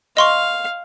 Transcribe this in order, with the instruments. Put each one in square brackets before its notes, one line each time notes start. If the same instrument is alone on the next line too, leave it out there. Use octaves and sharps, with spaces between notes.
[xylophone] D#5 C6 C#6 [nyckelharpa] F5